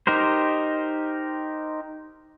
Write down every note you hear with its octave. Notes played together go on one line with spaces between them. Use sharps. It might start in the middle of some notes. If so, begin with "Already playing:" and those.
D#4 G4 A#4 C5